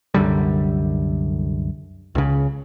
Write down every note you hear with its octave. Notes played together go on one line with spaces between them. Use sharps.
C2 F#2 D3 G3
C#2 C#3